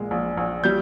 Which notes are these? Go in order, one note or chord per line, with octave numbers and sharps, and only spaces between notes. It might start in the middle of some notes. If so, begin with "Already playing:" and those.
Already playing: A#1 A#2 G#3
A#1
A#1
G3 G6